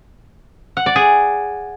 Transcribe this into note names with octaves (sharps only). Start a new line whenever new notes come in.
F#5
D5
G#4